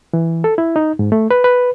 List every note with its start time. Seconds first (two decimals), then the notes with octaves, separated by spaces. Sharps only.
0.13 E3
0.44 A4
0.58 E4
0.76 D#4
0.99 G#2
1.12 A3
1.31 B4
1.44 B4